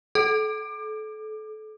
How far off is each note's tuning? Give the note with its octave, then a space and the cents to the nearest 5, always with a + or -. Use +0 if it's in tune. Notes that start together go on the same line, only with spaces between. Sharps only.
A4 -30